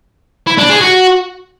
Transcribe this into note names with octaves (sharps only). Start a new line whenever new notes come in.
E4
D4
G#4
F#4